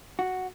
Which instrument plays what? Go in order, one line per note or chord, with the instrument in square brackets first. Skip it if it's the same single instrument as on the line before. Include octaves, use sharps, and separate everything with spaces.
[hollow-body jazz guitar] F#4